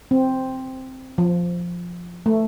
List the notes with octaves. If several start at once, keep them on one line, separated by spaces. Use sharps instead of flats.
C4
F3
A3